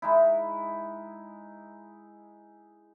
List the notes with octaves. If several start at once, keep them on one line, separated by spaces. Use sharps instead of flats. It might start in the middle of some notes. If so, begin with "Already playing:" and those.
G#3 D#4 E4